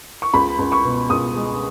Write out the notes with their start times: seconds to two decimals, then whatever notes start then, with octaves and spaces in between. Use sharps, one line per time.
0.22 C#6
0.34 C#2 B5
0.59 C#2
0.72 C#6
0.85 B2
1.10 C#2 D#6
1.36 G#3